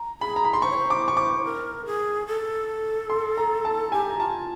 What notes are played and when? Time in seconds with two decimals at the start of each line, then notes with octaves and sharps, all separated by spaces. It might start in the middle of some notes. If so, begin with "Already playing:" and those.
Already playing: A#5
0.21 G#4 B5
0.36 A#5
0.44 B5
0.53 C6
0.62 C5 C#6
0.70 C#5
0.77 C5
0.90 D6
1.08 C#6
1.17 D6
1.44 A#4
1.86 G#4
2.27 A4
3.10 C6
3.37 A#5
3.65 A5
3.92 G4 G#5
4.10 A#5
4.19 F4 A5